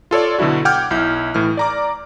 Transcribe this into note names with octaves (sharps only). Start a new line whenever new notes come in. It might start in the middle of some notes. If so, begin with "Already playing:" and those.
F4 A4 C#5 D5
B2 D3 F#3 E4 F#4
F#5 G5 D6 F6 G6 G#6
B1 E4 G6
A2 E3 F6
D5 A#5 D6